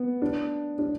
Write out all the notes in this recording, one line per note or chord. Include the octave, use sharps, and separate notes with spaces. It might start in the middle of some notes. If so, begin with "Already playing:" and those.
Already playing: B3
D4
D4